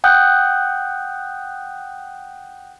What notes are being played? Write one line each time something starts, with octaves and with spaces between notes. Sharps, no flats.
F#5 G5 D#6 F#6 G6